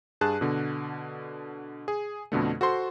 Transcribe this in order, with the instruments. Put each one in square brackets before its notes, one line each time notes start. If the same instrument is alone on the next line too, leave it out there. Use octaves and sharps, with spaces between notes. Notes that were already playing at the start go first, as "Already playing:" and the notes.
[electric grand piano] G2 G#4 A5 F#6
B2 D3
G#4
F2 B2 D3 A3
F#4 A4 C5 C6